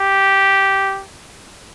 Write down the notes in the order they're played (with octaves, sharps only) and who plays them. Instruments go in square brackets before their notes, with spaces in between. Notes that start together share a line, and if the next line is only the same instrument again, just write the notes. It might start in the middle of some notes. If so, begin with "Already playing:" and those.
Already playing: [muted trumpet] G4